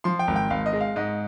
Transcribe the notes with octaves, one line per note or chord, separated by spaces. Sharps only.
F3 C6
G5
G#1
G5
G#1 F5
D#5
G#3
F5
G#2 D#5